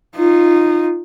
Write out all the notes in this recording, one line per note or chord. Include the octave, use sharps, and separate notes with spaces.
D#4 F4